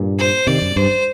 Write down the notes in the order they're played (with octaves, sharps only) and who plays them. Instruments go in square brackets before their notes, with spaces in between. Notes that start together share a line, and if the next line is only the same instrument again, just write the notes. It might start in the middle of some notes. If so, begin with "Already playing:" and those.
Already playing: [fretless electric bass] G2 A#2
[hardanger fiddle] C5
[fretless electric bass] C3 D#3 [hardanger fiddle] D5
[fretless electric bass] F#2
[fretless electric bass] G2 [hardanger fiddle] C5